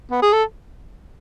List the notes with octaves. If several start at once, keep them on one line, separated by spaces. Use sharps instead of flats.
B3
G#4
A4